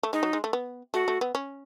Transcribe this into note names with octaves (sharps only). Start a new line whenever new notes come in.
A3
G#3 D#4
F#3
G#3
A3
B3
A3 F#4
A3
B3
C#4